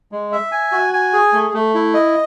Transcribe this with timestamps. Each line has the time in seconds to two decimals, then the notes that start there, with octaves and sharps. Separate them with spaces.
0.12 G#3
0.32 E5
0.52 G#5
0.72 F#4
0.93 G#5
1.13 G#4
1.33 A3
1.54 A3
1.74 E4
1.94 D#5